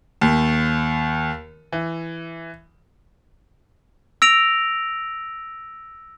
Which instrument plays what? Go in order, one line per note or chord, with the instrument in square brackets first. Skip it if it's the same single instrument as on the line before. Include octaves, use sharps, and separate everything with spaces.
[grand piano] D#2
E3
[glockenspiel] E6 A#6 D7 F7